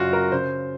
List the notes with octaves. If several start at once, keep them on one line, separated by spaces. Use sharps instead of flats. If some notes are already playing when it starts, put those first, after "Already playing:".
Already playing: F#2 C#3 F4 F#4
A#4
C#3 C5